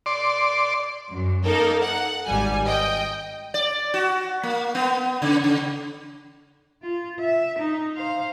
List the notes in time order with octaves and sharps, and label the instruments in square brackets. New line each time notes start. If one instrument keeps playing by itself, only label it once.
[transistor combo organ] D5 C6
[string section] F#2
A#3 D#4 A4 A#4
F#5
G#1 G3 G#5
D#5 G5
[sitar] D5
F#4
A#3
B3
C#3
C#3
[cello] F4
E5
D#4
C5 F5